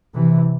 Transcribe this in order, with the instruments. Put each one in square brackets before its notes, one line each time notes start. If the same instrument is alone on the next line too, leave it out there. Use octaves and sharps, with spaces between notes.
[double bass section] C3 E3